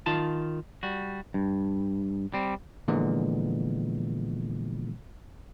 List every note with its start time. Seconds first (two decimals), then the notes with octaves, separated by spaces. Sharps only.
0.06 D#3 F4 A5
0.83 G3 F#4
1.34 G2
2.34 G3 C4
2.88 A#2 D3 E3 F3 G#3 B3